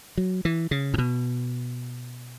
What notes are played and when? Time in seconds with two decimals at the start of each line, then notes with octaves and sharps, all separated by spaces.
0.17 F#3
0.45 E3
0.71 C#3
0.94 A2
0.98 B2